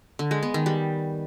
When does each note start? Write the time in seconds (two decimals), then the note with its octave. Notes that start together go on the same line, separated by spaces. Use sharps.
0.19 D3
0.31 G#3
0.43 B3
0.54 D#3
0.66 G3